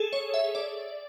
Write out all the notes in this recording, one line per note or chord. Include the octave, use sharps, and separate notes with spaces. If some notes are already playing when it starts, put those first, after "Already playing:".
Already playing: G#4 A4
C#5
E5
D5